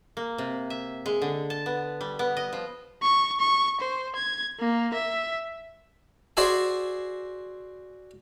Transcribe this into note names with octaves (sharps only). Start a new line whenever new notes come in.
A#3
C3
E5
G#3
D3
A5
B3
G3
B3
D#5
F3
C#6
C#6
C5
G#6
A#3
E5
F#4 G#4 C5 D5 E5 G#5